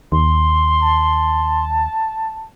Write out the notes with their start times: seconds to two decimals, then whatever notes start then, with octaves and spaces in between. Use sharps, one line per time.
0.12 D#2 C6
0.83 A5